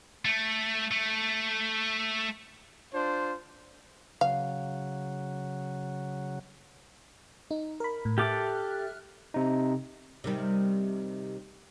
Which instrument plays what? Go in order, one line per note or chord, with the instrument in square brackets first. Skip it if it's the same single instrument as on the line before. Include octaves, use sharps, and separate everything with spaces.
[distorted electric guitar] A3
A3
[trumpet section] D4 F4 C5
[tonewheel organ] C#3 F#3 [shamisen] F5
[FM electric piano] D#4
A#4 B5
A2
[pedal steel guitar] G4 A4 D6 [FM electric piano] E5 F6 F#6
[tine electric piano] C3 D#4
[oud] C3 D#3 G3